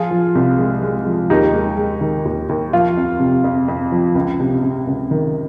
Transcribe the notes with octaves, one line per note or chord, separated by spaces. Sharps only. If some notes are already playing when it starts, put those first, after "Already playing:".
Already playing: F3 F4 G#4
F3
C2
G#3
G#3
F3
D#2 D#4 G4
G#3
G#3
D#3
D#2
D#2
F3 F4
F2
C3
F2
F2
F3
C#2
C3
C3
C#2
D#3